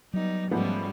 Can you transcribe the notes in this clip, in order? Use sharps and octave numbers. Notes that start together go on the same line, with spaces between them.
F#3 G3 B3 D#4
G#2 F3 G3 A3 B3 C#4